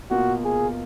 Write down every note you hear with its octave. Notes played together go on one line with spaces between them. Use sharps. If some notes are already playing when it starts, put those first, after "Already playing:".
B2 A#3 F4 F#4
G#4